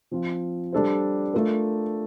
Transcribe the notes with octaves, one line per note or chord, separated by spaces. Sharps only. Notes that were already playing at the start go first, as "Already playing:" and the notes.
F3 C4 F4
G3 D4 A4 C5
A3 D4 F4 A#4